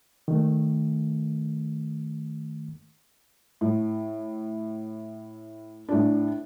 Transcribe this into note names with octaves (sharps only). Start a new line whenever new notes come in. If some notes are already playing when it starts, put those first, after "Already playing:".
D#3 A3
A2
A2 D4